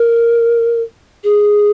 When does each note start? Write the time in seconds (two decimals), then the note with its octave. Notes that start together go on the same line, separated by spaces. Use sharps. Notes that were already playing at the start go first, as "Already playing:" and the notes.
Already playing: A#4
1.24 G#4